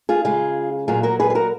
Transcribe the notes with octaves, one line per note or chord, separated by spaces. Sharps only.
F4 G#4
C#3 G#3 F4 G#4
A#2 F#3 F4 G#4
F#4 A#4
G#4 B4
G#4
F#4 A#4